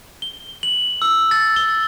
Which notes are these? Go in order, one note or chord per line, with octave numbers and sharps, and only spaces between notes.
G7
F#7
E6
A6
G7